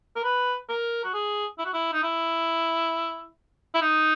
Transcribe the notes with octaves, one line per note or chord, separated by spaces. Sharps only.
A#4
B4
A#4
F#4
G#4
E4
F#4
E4
D#4
E4
E4
D#4